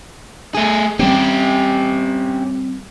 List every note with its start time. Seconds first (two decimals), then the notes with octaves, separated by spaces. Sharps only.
0.55 A3 G#4
0.99 G3 C4 C#4 G4